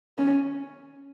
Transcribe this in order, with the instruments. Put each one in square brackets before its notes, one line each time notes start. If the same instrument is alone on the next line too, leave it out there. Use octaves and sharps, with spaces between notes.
[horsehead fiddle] C#4